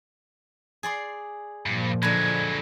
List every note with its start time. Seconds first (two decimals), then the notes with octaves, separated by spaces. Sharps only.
0.83 G#4 D5 C6
1.66 G2 A#2 F3
2.02 D3 F#3 G#3 B4 G#6